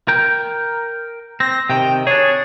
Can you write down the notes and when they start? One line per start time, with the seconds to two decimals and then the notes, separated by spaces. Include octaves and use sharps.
0.08 A#4 G5
1.40 C4 A#6
1.70 C3 D#3 G5
2.07 D4 G#4 C#5